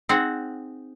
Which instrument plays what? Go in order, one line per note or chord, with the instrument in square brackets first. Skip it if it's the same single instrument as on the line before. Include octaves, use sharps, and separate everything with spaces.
[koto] C4 D#4 G#4 F#5